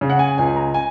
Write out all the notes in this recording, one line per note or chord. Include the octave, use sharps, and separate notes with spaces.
C#3
F#5
G#5
C#2 G#5
A#5
G#5